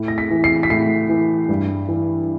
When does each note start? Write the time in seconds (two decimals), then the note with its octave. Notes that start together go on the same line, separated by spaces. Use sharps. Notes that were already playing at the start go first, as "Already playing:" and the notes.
Already playing: A2
0.08 A#6
0.18 B6
0.31 E3
0.44 C7
0.63 B6
0.70 A2 C7
1.09 E3
1.49 G2
1.88 E3